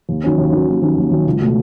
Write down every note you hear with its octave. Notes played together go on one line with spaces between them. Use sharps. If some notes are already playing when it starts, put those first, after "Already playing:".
D#2
D#3 F#3 C#4
D#2
D#3 F#3 C#4
D#2
D#3 F#3 C#4
D#2
D#3 F#3 C#4
C#2
B2 A3